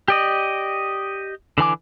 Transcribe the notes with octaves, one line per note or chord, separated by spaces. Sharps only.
G4 D5 D#5
D3 E3 G#5 D6